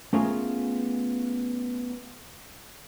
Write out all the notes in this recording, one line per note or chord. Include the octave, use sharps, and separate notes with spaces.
A3 B3 C#4 F4 G#4 A#4